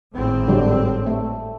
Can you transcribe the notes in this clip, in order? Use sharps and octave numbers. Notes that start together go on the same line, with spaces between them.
G#1 A2 C4
D3 F#3 G3
A3